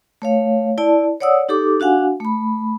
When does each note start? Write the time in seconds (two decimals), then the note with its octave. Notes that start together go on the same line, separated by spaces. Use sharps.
0.22 A3 C#5 F5
0.78 E4 D5 A5
1.20 C#5 D5 F#5 D#6 E6
1.49 D#4 G4 A4 D6
1.80 D4 F#4 F5 F#5 G#5
2.20 A3 B5